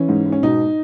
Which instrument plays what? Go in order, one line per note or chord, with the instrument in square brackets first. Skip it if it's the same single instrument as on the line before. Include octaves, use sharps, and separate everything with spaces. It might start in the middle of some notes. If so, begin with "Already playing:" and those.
Already playing: [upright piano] E3 C#4
G#2
G#2
C#4
B2 D#4